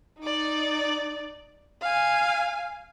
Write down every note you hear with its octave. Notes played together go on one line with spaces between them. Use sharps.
D#4 D5
F5 G#5